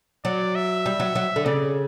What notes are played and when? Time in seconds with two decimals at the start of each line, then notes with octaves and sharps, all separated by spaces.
0.25 F#3 D5
0.55 E5
0.86 G3
1.00 F#3
1.15 F#3
1.36 D3
1.45 C#3 D5